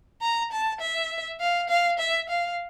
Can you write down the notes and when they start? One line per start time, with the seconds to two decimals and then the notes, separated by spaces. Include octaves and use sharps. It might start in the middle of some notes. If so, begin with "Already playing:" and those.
0.22 A#5
0.52 A5
0.81 E5
1.40 F5
1.69 F5
1.99 E5
2.29 F5